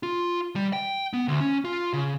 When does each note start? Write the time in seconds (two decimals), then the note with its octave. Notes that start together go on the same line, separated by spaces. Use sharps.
0.03 F4
0.56 G3
0.73 G5
1.13 B3
1.28 D2
1.40 C#4
1.65 F4
1.93 C#3